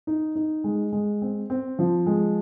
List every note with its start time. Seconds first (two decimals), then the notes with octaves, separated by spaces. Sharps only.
0.07 D#4
0.36 D#4
0.64 G#3
0.93 G#3
1.22 C4
1.50 C4
1.79 F3
2.07 G#3